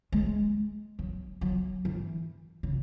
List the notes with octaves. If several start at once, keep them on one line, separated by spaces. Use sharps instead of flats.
G#3
F#3
F#3
E3
C#3